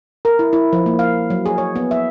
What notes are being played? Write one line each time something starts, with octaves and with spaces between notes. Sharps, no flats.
A#4
E4
E4
F3
A#3
F5
F#3
G#4
C#5
B3
E5